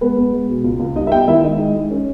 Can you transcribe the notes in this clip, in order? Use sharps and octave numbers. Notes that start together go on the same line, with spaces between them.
G#3 B3 B4
B3
G#3
B2
C#2
C#2
G3 D#4 D#5
E5
B3 G4 G5
D#3 E4 E5
G#3 D#4 D#5
G#3
G#3
C#4